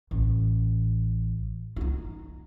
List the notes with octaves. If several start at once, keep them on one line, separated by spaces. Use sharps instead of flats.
A1
D#4 F4